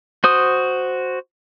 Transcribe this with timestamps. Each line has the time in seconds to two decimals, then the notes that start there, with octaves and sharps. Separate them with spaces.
0.24 F#4 C5 D#6